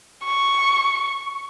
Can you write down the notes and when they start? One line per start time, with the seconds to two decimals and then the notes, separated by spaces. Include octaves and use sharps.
0.25 C#6